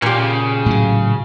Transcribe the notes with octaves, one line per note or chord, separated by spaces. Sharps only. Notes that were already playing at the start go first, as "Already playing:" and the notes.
A#2 A#3 C#4 G4
C#3
A2 F#3